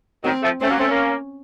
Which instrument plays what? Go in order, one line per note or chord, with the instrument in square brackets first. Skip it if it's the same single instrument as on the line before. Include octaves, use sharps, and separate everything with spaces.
[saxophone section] D#3 F#3 [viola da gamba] C4
[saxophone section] F3 A3
[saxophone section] A3 C4 [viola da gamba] C#4
[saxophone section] F#3 A#3
A3 C4
A#3 C#4